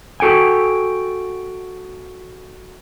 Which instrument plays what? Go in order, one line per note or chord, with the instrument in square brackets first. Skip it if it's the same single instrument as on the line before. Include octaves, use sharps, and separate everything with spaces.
[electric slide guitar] F#4 A4 G5 G#5